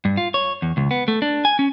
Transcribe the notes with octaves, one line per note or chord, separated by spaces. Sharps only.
G2
F4
C#5
E2
C#2
B3
A3
D4
G#5
C#4